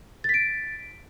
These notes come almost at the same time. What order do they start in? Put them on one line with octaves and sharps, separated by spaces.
A6 B6 D7